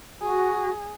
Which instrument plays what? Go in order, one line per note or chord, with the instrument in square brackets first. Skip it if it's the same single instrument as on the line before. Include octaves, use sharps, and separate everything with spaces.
[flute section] F#4 [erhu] G#4